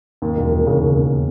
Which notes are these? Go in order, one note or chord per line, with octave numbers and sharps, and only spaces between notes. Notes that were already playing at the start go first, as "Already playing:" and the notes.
D#2
E1
E1
C#3
D#2
E1